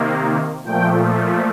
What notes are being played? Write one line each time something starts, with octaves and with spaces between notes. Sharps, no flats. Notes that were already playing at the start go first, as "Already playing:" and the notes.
Already playing: C3 D#3 A#3
A#2 F3 A3 G5